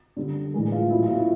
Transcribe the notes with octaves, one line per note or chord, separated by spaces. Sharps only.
D3 G3
A2 E3 G#3
F4
A#2 F#3 E4
F4
E4 F#4